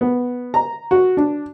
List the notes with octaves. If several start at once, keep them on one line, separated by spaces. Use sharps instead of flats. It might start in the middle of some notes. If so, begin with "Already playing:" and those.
B3
A#5
F#4
D4